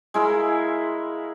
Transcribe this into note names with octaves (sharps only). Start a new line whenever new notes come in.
G#3 E4 A#4 F5